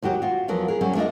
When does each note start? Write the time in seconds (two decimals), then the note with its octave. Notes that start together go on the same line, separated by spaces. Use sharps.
0.02 D#2 F#3 F#4 G4
0.22 F4 F#4
0.48 E2 F3 F#3 A#4
0.68 G#4 A#4
0.81 F#3 G3 C#4
0.95 A3 D4 E4 F4 D#5